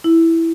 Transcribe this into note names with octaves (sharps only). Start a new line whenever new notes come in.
E4